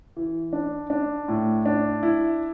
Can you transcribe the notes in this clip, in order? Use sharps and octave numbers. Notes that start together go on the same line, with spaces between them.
E3
D4
D4
A2
D4
E4